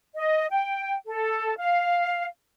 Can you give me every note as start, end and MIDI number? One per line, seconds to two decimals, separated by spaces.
0.15 0.46 75
0.50 0.95 79
1.07 1.54 69
1.58 2.25 77